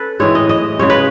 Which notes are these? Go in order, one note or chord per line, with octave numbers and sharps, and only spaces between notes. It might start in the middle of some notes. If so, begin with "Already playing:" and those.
Already playing: C#4 A4 B4
A2 E3 G#3 C#5
D#5
D#5
C#3 G#3 C#4 C#5
B4